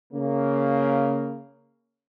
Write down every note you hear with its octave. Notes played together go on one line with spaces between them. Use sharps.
C#3 A#3